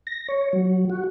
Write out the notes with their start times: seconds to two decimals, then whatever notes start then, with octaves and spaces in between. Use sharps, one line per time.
0.07 A#6
0.28 C#5
0.53 F#3
0.90 F#4